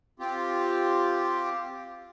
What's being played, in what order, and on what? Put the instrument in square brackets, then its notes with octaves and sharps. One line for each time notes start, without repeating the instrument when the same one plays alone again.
[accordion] C4 F4 G4